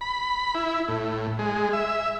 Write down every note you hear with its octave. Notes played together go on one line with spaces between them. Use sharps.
B5
E4
A2
G#3
E5